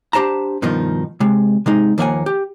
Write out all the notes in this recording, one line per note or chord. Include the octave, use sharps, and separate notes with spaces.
D4 G4 C5 A5 A#5
G2 B2 D#3 F3 D#4
C3 G#3
C3 G#3 D#4
D#2 F3 A#3 E5 F#5 G#5
G4